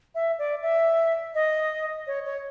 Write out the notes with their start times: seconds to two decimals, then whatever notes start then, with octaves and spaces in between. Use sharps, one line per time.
0.15 E5
0.39 D5
0.62 E5
1.35 D#5
2.07 C#5
2.25 C#5